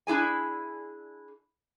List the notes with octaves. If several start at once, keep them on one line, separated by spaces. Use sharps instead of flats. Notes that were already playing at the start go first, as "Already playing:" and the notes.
D4 E4 G#4 G#5